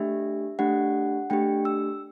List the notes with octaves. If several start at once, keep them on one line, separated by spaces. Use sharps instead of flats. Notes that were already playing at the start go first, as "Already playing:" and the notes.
Already playing: A3 D4 G4 E5
A3 D4 G4 F#5
A3 D4 G4 G5
E6